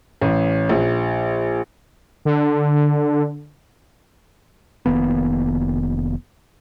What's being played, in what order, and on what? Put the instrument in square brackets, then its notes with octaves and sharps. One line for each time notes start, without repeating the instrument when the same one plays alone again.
[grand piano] A1
A#1
[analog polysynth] D3
[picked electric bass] F1 D#3 A#3 B3